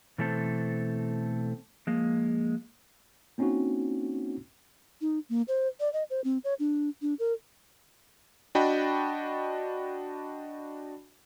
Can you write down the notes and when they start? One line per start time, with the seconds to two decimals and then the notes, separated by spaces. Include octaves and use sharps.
0.18 B2 E3 A3 C4 A4 C5
1.87 F3 G#3 A#3
3.38 A#3 C4 C#4 D#4 E4 F#4
5.01 D#4
5.29 A#3
5.48 C5
5.80 D5
5.93 D#5
6.10 C5
6.24 C4
6.44 C#5
6.59 D4
7.02 D4
7.19 A#4
8.55 D4 F#4 D#5 G5 A5 B5